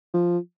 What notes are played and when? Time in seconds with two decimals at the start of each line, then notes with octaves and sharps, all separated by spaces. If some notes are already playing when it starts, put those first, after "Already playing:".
0.14 F3